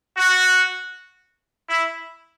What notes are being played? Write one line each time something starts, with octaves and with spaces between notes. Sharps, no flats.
F#4
E4